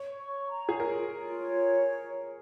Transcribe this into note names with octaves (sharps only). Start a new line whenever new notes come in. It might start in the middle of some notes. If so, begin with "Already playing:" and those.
Already playing: C#5
C#6
A#5
G#4
F4 A#4
F4
C#5